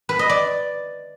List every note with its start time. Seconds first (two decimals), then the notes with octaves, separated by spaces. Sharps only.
0.09 B4
0.19 D#5
0.29 D5